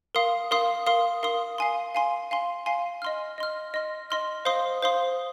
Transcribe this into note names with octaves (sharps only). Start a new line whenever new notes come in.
A#4 F5 C6 D#6
A#4 F5 C6 D#6
A#4 F5 C6 D#6
A#4 F5 C6 D#6
F5 G#5 C6
F5 G#5 C6
F5 G#5 C6
F5 G#5 C6
D#5 C6 F6
D#5 C6 F6
D#5 C6 F6
D#5 C6 F6
C5 F5 C6 D#6
C5 F5 C6 D#6